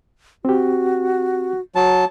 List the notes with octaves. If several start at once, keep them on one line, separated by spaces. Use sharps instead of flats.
C4 F#4 G4
F#3 A5